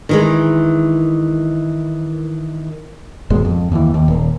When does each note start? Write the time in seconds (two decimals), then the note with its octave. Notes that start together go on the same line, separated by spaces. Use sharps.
0.09 D#3 E3 G#3
3.30 D#1 G#1 B2 G#3
3.45 F2
3.72 D#2 E3
3.94 D#2
4.08 D#1